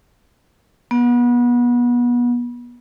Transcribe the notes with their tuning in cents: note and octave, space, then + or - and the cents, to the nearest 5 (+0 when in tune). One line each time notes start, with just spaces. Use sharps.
B3 -30